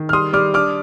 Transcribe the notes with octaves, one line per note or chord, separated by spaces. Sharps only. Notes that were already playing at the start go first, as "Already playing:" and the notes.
Already playing: D#3
F6
G3 C6 D#6
G3 D6 F6
D4 D6 F6